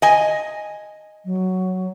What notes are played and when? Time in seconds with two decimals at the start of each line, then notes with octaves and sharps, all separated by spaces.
0.02 D#5 G#5
1.25 F#3